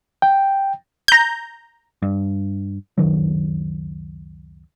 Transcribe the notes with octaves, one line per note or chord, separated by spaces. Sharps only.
G5
A#5 G6
G2
C#2 F#2 D#3 F#3